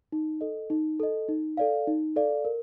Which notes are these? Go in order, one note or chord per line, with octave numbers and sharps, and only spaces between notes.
D#4
A4 D#5
D#4
A4 D#5
D#4
A4 D5 F5
D#4
A4 D5 F5
A#4